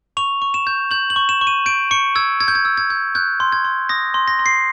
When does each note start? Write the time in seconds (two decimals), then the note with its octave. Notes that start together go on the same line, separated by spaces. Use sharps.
0.17 C#6 F7
0.42 C#6
0.54 E7
0.67 G6
0.91 G6 F#7
1.10 F#7
1.16 C#6
1.29 E7
1.41 C#6
1.47 D#7
1.66 G6 D7
1.91 C#6 C#7
2.16 E6 G#6
2.40 E6 G#6
2.48 G6
2.55 G#6
2.65 E6
2.77 G#6
2.90 G6
3.15 F#6 G6
3.40 C6
3.52 G#6
3.65 C6
3.89 D#6 A#6
4.14 C6
4.28 A#6
4.39 C6
4.46 C7